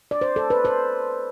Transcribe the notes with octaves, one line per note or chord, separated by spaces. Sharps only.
D5
C5
A4
B4
C5